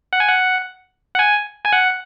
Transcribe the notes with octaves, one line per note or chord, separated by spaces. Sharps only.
F#5
G#5
F#5
F#5
G#5
G#5
F#5